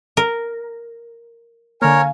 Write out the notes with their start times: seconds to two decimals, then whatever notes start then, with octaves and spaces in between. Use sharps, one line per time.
0.17 A#4
1.82 D3 A#3 A#4 C#5 F5 G#5